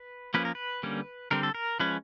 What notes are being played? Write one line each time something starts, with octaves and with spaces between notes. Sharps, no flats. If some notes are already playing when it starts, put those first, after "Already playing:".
Already playing: B4
F3 A#3 C#4 B4
A#4
B4
D3 G3 A#3 C#4
D3 G3 C4 A#4
A4
A#4
F3 G#3 C#4 B4